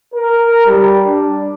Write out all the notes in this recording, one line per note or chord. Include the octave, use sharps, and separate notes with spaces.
A#4
G3
D4